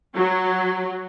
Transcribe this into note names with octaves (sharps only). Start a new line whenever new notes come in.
F#3